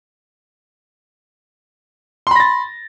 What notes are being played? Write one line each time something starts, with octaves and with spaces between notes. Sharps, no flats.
B5 C6 A6 A#6